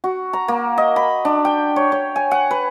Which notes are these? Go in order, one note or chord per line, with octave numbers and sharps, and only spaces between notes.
F#4
A#5
A#3
D#5
B5
D4
G5
C#5
C#5
G#5
F#5
B4